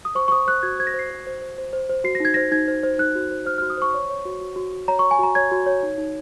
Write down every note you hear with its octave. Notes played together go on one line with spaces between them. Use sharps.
D#6
C5 C#6
C#6
C5 D#6
C5 F#6
F#4 G#6
C5 G#6
A#6
C5
C7
C5
C5
C5
C5
C5
C5
F#4 C7
A#6
D#4 G#6
C5 A#6
D#4 G#6
C5
C5
D#4 F#6
F#4
C5
C5 F6
F#4 F6
D#6
C5 C#6
C#5
C#5
F#4
F#4
F#4
F#4
C#5 A#5
C#5 C#6
G#5
F#4 A#5
C#5 G#6
F#4
C#5
D#4
D#4